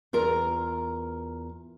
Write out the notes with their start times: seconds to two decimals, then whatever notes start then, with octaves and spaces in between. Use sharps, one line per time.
0.13 E2 F4 A#4 A#5